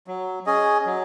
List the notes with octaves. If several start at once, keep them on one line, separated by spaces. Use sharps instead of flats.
F#3
C#4 G#4 D#5
F#3